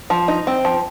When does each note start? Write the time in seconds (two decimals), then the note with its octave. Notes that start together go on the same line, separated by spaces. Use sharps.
0.10 F3
0.28 D#4
0.47 C4
0.65 F3